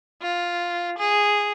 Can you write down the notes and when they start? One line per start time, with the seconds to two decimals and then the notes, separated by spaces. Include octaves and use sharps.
0.22 F4
0.98 G#4